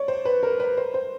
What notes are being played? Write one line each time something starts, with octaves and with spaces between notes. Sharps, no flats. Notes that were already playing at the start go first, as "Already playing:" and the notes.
Already playing: C#5 D5
C5
B4
A#4
B4
C5
C5